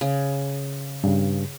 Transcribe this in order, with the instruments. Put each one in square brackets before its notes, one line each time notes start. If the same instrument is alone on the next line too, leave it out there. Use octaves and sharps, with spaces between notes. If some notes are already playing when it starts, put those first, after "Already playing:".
[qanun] C#3
[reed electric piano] G2 C#3